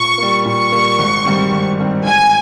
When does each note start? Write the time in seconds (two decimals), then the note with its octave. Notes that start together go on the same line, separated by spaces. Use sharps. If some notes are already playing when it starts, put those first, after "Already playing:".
Already playing: A#2 C#6
0.18 G3 A#3
0.45 A#2 C#6
0.72 G3 A#3
0.99 G#1
1.25 G2 D#3 G3 C4
1.52 G#1
1.79 G2 D#3 G3 C4
2.05 G#1 G#5